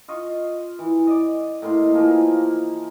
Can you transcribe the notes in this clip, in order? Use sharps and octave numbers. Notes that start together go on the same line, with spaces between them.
F4 D#5 C#6
E3
D5 D#5
A2 A#3 D#4 C6
E3 F3 A#3 G#4